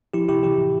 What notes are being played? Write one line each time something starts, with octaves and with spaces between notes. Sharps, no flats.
F3 E4 G4
C3 E4 G4
E3 E4 G4
A2